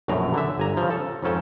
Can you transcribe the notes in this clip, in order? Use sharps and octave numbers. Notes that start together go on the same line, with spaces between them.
A#1 F#2 B2 A3 A#5
D3 E5
G1 G#5 A#5
C#3 F3
A4
F2 G#2 C#4 A4 G5